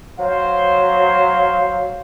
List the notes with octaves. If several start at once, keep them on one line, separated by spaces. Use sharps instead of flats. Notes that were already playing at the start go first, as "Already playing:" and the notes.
F#3 C5 F5